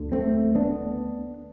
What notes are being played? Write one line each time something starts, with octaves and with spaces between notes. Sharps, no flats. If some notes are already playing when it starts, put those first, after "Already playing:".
Already playing: D2 D3
A3 C4
B3 D4